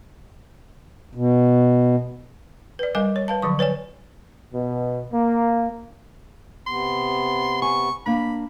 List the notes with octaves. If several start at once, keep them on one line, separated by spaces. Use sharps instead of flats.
B2
B4 D5
G3 A#4 D#5 G#5 D6
C#5
B4 F5 A5
D3 F3 F#3 C#6
B4 C#5 D5 G#5
B2
A#3
C3 B3 C6
G#5 C#6
A#3 D4 B5